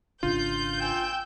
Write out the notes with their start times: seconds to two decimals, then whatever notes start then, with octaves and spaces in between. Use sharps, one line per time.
0.23 G#1 C#3 D4 F4 G6
0.79 G5 G#5 E6